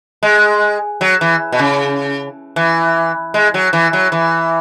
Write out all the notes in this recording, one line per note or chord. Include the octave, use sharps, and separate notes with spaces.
G#3
F#3
E3
B2
C#3
E3
G#3
F#3
E3
F#3
E3